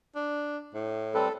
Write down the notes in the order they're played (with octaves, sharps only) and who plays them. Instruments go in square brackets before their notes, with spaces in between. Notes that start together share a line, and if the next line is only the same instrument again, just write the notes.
[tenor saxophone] D4
A2
[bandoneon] G3 C4 B4 [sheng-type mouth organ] A4